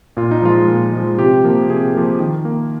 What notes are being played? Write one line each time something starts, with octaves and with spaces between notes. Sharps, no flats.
A#2 F4
D#4
F3 G#3 F4
A#2
F3 G#3
C3 G4
F3 A#3
C3 G#4
F3 A#3
D#3
A#3